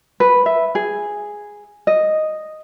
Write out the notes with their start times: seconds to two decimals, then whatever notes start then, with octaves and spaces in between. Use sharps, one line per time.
0.20 B4
0.46 E5
0.75 G#4
1.87 D#5